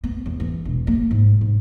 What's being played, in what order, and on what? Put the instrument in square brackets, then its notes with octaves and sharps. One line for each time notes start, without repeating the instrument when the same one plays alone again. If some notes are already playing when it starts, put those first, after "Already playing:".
[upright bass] B3
E2
E3
E1
A#3
G#2
G#2